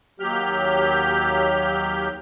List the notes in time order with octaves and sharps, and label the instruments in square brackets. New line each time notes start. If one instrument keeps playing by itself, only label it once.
[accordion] D#2 F#3 G4 F6 G6